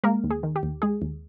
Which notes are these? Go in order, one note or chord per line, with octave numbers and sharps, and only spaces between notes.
G#3 A#3 A#4
D#2
G#4
D#3
G4
D#2
G#3 G#4
D#2